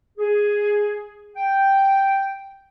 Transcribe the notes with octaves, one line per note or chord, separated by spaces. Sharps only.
G#4
G5